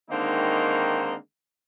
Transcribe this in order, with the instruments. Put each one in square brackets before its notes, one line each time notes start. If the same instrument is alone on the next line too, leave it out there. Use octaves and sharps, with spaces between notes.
[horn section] D3 D#3 G#3 A#3 C4 D#4